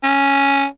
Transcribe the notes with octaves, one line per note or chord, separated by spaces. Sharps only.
C#4